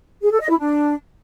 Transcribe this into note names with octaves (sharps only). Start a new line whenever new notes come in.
G#4
A4
D#5
E4
D4